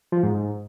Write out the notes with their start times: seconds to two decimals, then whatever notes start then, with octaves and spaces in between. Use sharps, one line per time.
0.12 F3
0.23 G#2
0.34 G#2